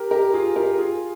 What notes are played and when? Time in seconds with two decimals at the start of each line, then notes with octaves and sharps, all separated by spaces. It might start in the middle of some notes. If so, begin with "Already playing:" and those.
Already playing: G4 A#4
0.11 G4 A#4
0.33 F4 G#4
0.56 G4 A#4
0.78 F4 G#4